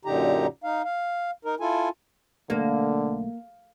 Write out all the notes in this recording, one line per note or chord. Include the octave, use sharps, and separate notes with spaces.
F#2 A#2 D3 D#4 G4 A#5
D#4 F5
F5
D#4 A#4
E4 F4 A4 G#5
B1 D3 A3 A#3